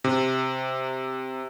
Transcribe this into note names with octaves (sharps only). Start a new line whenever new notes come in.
C3